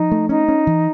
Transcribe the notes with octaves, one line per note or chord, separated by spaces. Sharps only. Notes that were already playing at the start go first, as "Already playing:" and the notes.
Already playing: F3 D#4
A3
C#4 D#4
C#4
E3